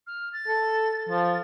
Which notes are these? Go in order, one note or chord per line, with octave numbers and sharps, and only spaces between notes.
F6
A6
A4
F3 A6